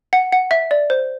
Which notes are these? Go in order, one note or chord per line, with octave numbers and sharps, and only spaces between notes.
F#5
F#5
E5
D5
C5